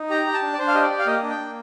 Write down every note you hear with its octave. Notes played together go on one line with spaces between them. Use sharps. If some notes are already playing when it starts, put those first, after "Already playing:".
Already playing: D#4
G4 A#5
G4
A5
D4
D5
D4 C5
F5
G4 D#5
D5
G4
F5
A#3 D#5
D4
G5
A#3